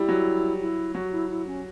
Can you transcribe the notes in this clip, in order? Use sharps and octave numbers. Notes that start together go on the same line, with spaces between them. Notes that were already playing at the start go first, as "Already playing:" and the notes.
Already playing: G3 E4
F#3
E4
F#3 F#4
E4
E4
C#4